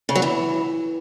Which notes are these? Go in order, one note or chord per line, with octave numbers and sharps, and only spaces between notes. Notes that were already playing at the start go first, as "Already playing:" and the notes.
C#3
F#3
E3